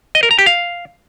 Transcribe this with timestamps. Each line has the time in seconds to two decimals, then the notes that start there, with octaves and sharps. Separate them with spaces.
0.15 D#5
0.23 A#4
0.31 A#5
0.39 G4
0.46 F5